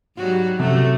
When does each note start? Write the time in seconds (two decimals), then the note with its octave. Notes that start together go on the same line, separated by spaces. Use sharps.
0.17 G#2 F#3 G3 F#4
0.59 F#2 C3 A3 F#4